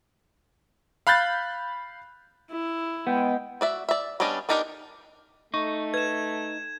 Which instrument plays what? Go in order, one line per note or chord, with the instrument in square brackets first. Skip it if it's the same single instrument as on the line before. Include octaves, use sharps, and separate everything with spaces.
[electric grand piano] F5 B5 F#6 G6 A6
[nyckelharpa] E4
[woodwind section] G#3 G5 [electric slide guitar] B3
[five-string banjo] F#4 D5 E5
D5 E5
G3 B3 C#4 D4 D#5
B3 D4 D#4 G4 A#4
[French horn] A3 [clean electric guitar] D#4 [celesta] C#6
[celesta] B4 [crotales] G#6 E7